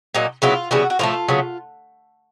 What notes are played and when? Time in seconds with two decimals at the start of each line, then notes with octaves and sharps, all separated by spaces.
0.15 A#2 F#3 A#3 D#4
0.42 C#3 F#3 B3 E4 F4
0.71 C#3 E3 G3 B3 F#4
0.90 F#4
0.99 A2 F3 A3 F4
1.28 C#3 F#3 B3